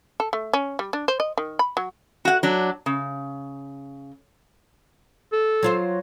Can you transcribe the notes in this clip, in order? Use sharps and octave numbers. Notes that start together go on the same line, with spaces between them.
A4
A3
C#4
G3
D4
C5
D#5
D#3
B5
F#3
F#4 F#5
F#3 D4
C#3
A4
F#3 F4 C5